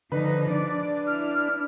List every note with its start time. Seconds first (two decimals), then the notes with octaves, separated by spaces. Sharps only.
0.12 D3 F3 D#4 B4
0.50 D4 D5
1.07 E4 F6